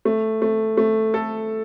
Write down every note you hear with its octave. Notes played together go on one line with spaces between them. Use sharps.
A3
A3
A3
A4